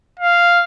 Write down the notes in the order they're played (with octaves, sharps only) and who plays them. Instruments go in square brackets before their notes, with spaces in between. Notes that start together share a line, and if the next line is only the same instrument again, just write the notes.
[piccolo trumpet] F5